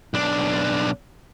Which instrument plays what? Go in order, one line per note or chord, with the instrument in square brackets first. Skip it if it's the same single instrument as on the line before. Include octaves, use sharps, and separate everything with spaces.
[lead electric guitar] B1 D4